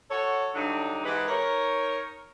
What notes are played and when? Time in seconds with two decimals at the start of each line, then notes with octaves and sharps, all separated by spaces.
0.10 F#4 A4 C#5
0.54 G2 D3 F#3 D4 D#4
1.04 G#2 E3 G#3 G4 B4
1.28 D#4 A#4 C#5